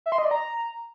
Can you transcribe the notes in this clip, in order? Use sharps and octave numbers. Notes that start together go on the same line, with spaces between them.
E5
C6
D#5
D5
A#5